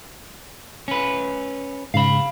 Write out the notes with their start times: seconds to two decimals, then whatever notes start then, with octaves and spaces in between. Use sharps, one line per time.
0.88 C#4 B4
1.94 G#2 C#3 F5 B5